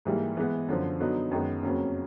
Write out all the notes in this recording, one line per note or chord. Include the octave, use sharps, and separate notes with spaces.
G#2 E3 G3 A#3
E3 G#3 B3 E4
F#2 D3 F3
D3 F#3 B3 D#4 F#4
F#2 D#3 G#3 B3
F2 C#3 F#3 A#3 C#4